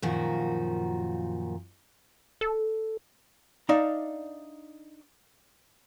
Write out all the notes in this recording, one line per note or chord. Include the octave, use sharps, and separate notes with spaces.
F#2 A#2 D#3 F3 F#4
A4
D4 D#4 D5 E5 F5 A#5